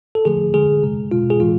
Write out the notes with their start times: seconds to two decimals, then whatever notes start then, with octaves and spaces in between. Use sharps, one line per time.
0.15 A4
0.25 D3 F3 A3 G#4
0.54 D3 G#3 G#4
0.83 C3 G#3
1.11 B2 G#3 F4
1.30 G#4
1.40 A2 E3 G#3 F4